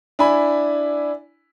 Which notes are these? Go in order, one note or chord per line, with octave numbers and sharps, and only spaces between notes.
D4 E4 G#5 B5